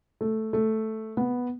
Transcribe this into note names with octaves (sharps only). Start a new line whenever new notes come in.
A3
A3
B3